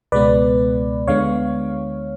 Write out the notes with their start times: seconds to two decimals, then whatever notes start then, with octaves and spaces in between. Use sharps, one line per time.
0.12 C#2 B2 G#3 B3 B4 D5
1.08 D2 D3 G#3 B3 C#5 F5